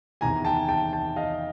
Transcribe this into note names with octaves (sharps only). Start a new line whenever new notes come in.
E2 C3 D#3 G#5 A#5
G5 A5
G5 A5
G5 A5
D#5 F5